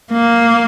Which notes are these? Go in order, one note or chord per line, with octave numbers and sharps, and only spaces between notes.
A#3